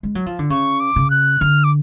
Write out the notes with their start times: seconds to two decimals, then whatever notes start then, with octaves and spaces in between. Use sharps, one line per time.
0.03 G#3
0.15 F#3
0.26 F3
0.39 D3
0.50 C#3 C#6
0.80 D6
0.96 C#3
1.10 F#6
1.41 D3 F6
1.64 D6